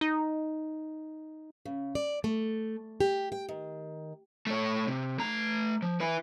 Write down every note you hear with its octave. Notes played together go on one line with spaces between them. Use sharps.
D#4
C#3
D5
A3
G4
G5
D#3
A3 C#5
C3
A3 A#5
F3
E4 B4